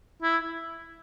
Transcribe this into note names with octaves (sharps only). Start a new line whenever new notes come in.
E4